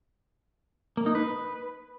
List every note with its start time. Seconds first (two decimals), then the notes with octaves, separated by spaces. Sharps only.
0.97 A#3
1.06 D#4
1.15 B4